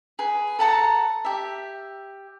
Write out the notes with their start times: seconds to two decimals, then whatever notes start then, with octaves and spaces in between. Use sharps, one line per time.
0.19 G#4 B4
0.59 A4 F#5 A5 A#5
1.25 G4 E5